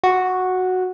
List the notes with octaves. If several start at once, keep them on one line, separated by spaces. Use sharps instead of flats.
F#4